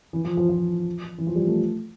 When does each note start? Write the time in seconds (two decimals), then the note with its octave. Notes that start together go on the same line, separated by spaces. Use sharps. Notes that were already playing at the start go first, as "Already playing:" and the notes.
0.13 E3
0.25 F3
0.37 F3
0.49 F3
1.18 E3
1.27 F3
1.35 G3
1.47 A3